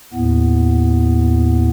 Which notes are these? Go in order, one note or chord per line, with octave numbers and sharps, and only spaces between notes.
D#2 A2 B3